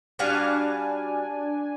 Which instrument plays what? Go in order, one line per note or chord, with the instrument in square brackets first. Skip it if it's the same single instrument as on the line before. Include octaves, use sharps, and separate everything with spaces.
[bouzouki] G3 F#4 F5 [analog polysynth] D4 G#5